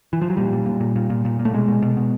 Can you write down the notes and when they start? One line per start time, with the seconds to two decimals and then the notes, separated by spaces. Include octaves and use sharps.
0.13 E3
0.21 F3
0.30 F#3
0.37 A#2 G3
0.53 A#2
0.66 A#2
0.80 A#2
0.96 A#2
1.10 A#2
1.25 A#2
1.39 A#2
1.45 A3
1.53 B2 G#3
1.68 B2
1.82 B2
1.97 B2